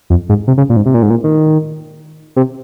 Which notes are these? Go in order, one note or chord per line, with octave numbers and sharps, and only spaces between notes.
F2
G#2
C3
C#3
A#2
G#2
C3
A#2
G#2
A#2
D#3
C3